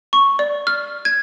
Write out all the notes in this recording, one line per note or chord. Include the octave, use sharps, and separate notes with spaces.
C#6
D5
F6
G#6